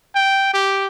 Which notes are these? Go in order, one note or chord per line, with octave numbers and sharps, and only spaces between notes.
G5
G4